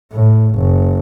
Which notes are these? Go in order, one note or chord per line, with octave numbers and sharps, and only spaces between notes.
A2
F#1